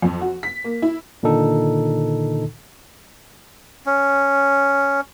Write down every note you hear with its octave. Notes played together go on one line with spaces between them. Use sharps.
F2
F#4
B6
A#3
E4
A#2 D3 D#3 D#4 A4
C#4